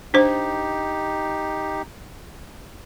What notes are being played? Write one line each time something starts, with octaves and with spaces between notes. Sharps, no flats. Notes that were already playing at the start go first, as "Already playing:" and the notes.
D4 D#4 G4 C5